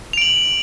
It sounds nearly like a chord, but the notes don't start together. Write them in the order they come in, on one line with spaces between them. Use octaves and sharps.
F7 D7 F#7